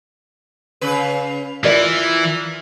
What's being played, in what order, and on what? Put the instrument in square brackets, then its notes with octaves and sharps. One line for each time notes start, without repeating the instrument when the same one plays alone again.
[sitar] C#3 B4
[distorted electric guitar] E3 [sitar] F4 [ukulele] A#4 D5